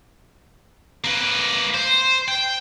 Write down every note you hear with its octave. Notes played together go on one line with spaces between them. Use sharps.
A#3 B4
C5
G5